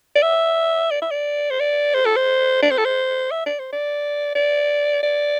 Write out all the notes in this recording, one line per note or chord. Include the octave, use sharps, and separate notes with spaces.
D5
E5
D5
E5
D5
C5
D5
C5
A4
C5
D5
C5
A4
C5
E5
D5
C5
D5
D5
D5